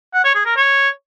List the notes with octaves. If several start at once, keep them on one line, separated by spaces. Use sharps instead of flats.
F#5
C#5
G#4
A#4
C#5